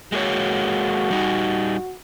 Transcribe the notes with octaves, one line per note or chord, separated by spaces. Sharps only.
G#3 A#3 F#4 C#5
G3 D#4